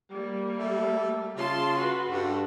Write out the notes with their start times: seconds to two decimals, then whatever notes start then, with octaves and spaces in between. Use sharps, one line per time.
0.12 G3 A#3
0.57 A3
1.36 C#3 F4 A5 C6
1.78 F#4 B4
2.09 G2 F#4 G4 A4